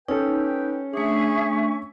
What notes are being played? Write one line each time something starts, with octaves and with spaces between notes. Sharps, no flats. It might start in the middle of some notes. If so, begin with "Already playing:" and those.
C#4 D#4 A4 B4 G5
A3 D4 G#4 E5 G#5 C#6